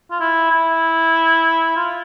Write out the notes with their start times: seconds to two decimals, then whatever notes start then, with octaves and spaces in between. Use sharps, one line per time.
0.11 F4
0.20 E4
0.51 E4
1.76 F4